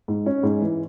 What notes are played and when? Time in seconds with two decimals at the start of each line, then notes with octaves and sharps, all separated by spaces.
0.08 G#2
0.26 C#4
0.43 G#2
0.62 E3